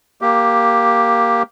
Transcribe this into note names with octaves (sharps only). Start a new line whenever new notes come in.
A#3 G4